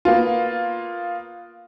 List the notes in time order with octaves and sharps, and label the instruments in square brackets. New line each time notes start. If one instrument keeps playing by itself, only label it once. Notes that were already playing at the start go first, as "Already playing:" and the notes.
[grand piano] A#3 B3 F4